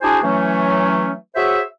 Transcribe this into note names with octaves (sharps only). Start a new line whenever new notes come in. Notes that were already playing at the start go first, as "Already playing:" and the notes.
D4 E4 F#4 G#4 C5 G#5
E3 F#3 A3 C#4
F#4 G#4 C5 C#5 E5